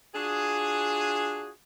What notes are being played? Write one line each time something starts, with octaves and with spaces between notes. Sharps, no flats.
D4 F4 F#4 G#4